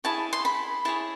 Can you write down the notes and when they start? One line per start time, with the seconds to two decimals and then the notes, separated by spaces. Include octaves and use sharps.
0.04 E4 G#4 C#5 A5
0.33 C6
0.45 B5
0.85 E4 G#4 C#5 A5